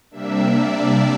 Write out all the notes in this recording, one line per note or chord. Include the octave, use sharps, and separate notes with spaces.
C3 G3 A#3 D4 E5
D5